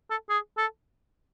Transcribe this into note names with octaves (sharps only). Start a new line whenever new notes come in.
A4
G#4
A4